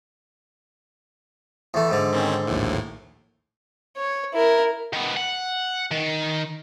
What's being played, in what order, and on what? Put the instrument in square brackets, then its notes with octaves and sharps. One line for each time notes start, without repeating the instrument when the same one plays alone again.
[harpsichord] E2 A3
G#2 D3
[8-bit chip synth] D#3 C4 C#4
A#1 D#2 A2
[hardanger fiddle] C#5
E4 A#4
[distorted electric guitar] D#3 B3
F#5
D#3